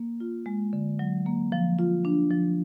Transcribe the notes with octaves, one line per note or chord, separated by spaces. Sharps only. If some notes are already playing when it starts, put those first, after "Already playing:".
Already playing: A#3
F4
G#3
D3
F#3
A#3
F3
F4
D4
F3